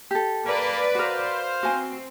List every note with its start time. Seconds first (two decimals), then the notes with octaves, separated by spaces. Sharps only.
0.11 G4 A4
0.45 A#3 B4 D5
0.95 F#4 A#4 C5 F5
1.63 C4 F#4 G#5